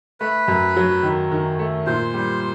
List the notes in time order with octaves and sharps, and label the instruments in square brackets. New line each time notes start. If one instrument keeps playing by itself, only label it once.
[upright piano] A3 [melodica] B4
[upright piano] F#2
F#3
D#3
D#3
A3
[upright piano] A#2 [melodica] C5
[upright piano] G3